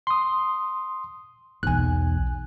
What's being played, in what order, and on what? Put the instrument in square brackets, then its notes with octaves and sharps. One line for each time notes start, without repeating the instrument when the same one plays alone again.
[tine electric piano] C6 D#6
[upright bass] B1 E2 [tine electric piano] G#5 F#6